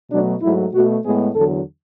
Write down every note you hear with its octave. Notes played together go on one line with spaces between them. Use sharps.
B2 F#3 A3 D4
G#2 F#3 A3 E4
B2 A3 F#4
A2 G#3 B3 G#4
E2 D3 F#3 A4